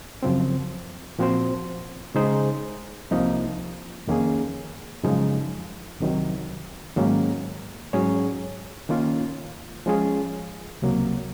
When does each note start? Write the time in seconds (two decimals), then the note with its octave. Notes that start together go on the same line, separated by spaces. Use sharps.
0.23 F#2 C#3 F3 C4
1.19 A#2 F3 C4 F#4 C5
2.14 C#3 G#3 D#4 G#4 C5
3.11 C2 C3 F3 A#3 D#4
4.07 F2 D#3 A#3 C#4 G#4
5.03 F#2 C#3 F3 G#3 D#4
6.00 C2 C3 D#3 F#3
6.96 G#2 D#3 F#3 A#3 C#4
7.93 G#2 F#3 C#4 G#4 C#5
8.89 D#3 A#3 C#4 F4
9.86 F3 G#3 C#4 F4 G#4
10.82 C#2 C3 F#3 A#3